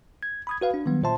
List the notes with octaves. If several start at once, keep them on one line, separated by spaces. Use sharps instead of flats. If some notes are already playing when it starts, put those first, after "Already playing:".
G#6
B5 D#6 G#6
F#4 B4 F5
D4
D#3 F#3 G3 B3
A#2 F4 C5 E5 A5 C6